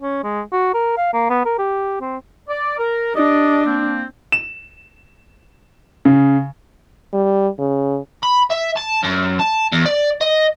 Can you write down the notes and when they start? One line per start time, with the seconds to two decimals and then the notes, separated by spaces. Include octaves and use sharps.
0.02 C#4
0.24 G#3
0.52 F#4
0.74 A#4
0.97 F5
1.13 A#3
1.30 B3
1.45 A#4
1.58 G4
2.01 C4
2.48 D5
2.78 A#4
3.16 D4 G4 D5 D#5
3.66 A#3 C4
4.32 E7
6.05 C#3
7.13 G3
7.59 C#3
8.23 B5
8.51 E5
8.77 A5
9.04 F#2
9.40 A5
9.72 E2
9.85 D5
10.21 D#5